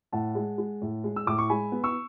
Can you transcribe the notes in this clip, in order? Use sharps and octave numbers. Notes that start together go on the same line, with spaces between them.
A2 F#5 A5
G#3
G#3
A2
G#3
E6
A2 D6
C#6
G#3 G#5 B5
B3
C#6 E6